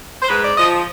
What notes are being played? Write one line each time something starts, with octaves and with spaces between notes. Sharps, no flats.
C5
G#2 B4
D5
F3 D#5